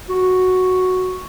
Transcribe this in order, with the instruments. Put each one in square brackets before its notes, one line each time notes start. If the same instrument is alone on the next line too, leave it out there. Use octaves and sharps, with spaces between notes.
[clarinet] F#4